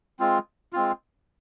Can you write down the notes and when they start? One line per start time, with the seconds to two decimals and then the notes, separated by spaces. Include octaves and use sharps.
0.19 G#3 C4 F4
0.73 G#3 C4 F4